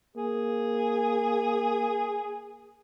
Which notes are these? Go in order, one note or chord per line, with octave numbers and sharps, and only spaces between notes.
A#3 G#4